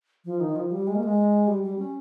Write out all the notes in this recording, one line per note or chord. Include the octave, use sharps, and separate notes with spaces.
F3
D#3
F3
G3
G#3
A#3
G#3
G3
G3
C#4